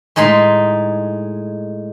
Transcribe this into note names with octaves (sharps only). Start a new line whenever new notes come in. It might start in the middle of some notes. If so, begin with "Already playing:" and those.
A2 G#3 D#4 B5 C6